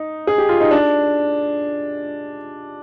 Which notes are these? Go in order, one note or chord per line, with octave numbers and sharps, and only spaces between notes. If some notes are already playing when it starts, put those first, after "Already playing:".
Already playing: D#4
G#4
G4
F4
D#4
D4